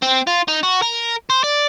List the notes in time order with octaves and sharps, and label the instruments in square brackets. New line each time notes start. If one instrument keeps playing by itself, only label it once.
[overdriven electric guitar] C4
F4
D#4
F#4
A#4
C5
D5